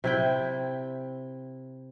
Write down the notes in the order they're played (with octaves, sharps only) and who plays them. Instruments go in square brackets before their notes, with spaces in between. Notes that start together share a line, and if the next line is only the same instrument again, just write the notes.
[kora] C3 E4 G5